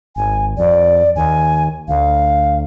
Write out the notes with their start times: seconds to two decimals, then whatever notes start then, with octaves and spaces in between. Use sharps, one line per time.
0.16 G#1 G#5
0.58 F2 D5
1.16 D#2 G#5
1.88 D2 F5